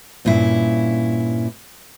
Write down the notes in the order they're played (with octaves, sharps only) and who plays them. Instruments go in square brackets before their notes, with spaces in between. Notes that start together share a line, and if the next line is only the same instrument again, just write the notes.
[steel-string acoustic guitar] G2 A#2 C#4 E4